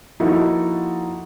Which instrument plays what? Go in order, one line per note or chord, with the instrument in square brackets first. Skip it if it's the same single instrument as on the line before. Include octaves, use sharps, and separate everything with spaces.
[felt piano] F3 A#3 D#4 E4 F#4 A4